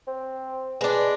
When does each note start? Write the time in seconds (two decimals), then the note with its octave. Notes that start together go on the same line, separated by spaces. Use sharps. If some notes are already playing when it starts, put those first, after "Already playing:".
0.07 C4
0.81 G#3 D4 B4